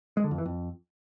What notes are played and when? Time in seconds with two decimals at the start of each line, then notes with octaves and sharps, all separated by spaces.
0.17 G#3
0.24 D3
0.31 F2
0.38 E3
0.45 F2